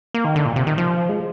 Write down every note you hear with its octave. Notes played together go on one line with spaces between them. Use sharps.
A#3
D#3
D3
A#2
C3
D#3
F3
G#3